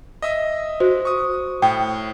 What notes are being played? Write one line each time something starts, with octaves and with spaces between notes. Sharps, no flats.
D#5 E5 D#6
F#4 C5
C#6 D#6
A2 G5